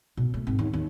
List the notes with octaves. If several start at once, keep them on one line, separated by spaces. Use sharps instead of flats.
B2
A3
G#1
D#2
D#2